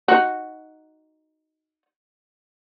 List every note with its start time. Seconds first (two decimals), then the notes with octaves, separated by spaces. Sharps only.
0.08 D#4 F#4